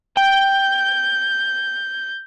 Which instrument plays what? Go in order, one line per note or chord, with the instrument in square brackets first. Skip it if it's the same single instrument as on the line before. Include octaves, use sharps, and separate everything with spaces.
[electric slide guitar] G5 [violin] G6